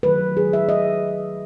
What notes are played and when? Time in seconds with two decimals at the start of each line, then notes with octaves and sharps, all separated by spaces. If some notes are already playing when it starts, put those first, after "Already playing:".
0.03 D#3 F#3 A3 B4
0.37 G#4
0.53 E5
0.69 D#5